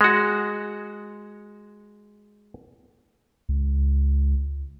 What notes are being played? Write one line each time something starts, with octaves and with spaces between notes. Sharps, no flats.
G#3 F#4
C#2